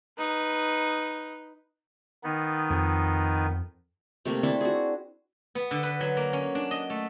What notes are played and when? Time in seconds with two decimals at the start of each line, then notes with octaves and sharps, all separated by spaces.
0.18 D#4 B4
2.24 D#3 B3 D#4
2.70 F2
4.25 C3 A3 A#3
4.43 C4 D4 E4 A4
4.61 F#4 G#4
5.55 B3
5.71 D3
5.83 B4
6.00 F#3
6.17 A#3
6.33 C#4
6.55 D4
6.71 D#5
6.90 A3